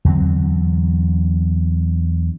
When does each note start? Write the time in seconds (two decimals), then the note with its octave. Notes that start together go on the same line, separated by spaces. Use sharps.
0.05 E2 D3 F#3 C4